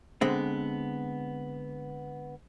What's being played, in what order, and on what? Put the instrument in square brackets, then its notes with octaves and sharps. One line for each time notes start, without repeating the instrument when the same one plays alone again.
[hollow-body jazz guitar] D3 G#3 B3 C4